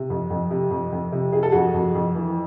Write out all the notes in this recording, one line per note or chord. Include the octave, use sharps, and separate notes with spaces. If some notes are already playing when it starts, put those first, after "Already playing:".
Already playing: C3
F2
F2
C3
F2
F2
C3
C3 G#4
A4
F2 F#4 G#4
F2
F2
E3